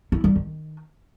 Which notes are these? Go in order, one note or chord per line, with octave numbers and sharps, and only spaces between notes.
E4
G3
D#3